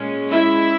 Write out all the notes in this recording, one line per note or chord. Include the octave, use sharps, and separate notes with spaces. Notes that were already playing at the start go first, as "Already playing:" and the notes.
Already playing: A#2 G#3 C#4
E4 E5